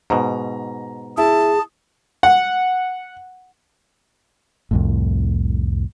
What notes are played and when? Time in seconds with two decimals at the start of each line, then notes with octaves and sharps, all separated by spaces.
0.10 G#2 B2 A#5
1.17 E4 G#4 A5
2.23 F#5
4.71 C2 F2 A2